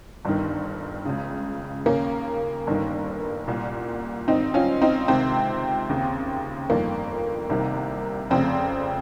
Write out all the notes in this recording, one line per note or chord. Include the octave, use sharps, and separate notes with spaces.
G1 G2 D#3
C#2 C#3
D#2 C#3 A#3 C#4
G1 G2 D#3
C2 A#2
G#1 G2 D#3 C4 D#4
C#4 F4
C4 D#4
C#2 C3 D#3 C4
D#2 C#3
G1 F2 D#3 A#3
C2 C3 D#3
F1 F2 C#3 C4